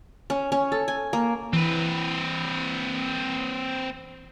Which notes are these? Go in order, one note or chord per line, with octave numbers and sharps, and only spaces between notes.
C#4
C#4
A4
G#5
A#3
E3 C4 B4